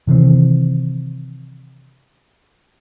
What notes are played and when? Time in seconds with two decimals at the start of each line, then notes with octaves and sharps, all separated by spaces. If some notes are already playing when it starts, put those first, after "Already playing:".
0.07 C3 D#3 E3 C4